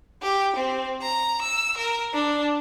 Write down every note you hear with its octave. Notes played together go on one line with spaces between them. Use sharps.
G4
C4
A#5
E6
A#4
D4